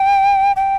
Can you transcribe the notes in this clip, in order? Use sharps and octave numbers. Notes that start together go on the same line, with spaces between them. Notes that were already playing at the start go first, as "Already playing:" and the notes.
Already playing: G5
G5